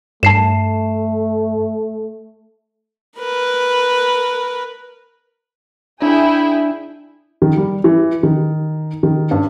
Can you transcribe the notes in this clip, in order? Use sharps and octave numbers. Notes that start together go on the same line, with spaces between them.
G2 A3 A5 C7 E7
A#4 B4
D4 E4 G#4 G5
D#3
G3
E3
D#3
D#3
G2